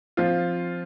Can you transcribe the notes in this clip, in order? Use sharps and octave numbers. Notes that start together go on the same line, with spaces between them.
F3 C4 F4